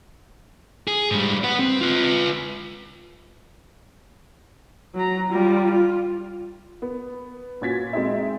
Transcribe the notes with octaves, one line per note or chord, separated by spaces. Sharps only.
G#4
G#2 G3
B4 F#5
C4
F4 B4
F#3 A#5
G3 F4
F4
B3
A#2 C#4 F#4 G#6 A6 B6
G#3 C4 D#4 E5